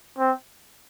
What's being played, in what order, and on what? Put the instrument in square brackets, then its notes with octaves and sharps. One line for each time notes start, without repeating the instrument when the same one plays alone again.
[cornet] C4